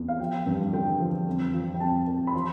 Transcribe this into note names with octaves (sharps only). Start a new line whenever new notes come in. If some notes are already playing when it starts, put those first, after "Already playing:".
Already playing: E2
F5
F3 G5
G2
D3 G5
F3
F2
F3
G5
F2 A5
F2
B5
F3 C6